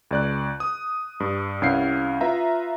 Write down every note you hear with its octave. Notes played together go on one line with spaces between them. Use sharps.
C#2 D5 F#6
D#6
G2
C2 C#4 E4 F5 C7
F4 B4 E5 A#5